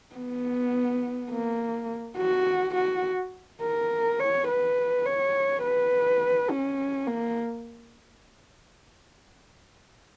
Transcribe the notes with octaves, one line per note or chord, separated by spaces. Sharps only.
B3
A#3
F#4
F#4
A#4
C#5
B4
C#5
B4
C#4
A#3